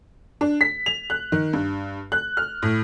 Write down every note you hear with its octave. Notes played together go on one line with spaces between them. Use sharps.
D4
B6
F7
F#6
D#3
G2
F#6
F6
A2